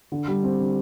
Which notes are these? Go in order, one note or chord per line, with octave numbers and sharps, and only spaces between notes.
D3
G3
C4
D3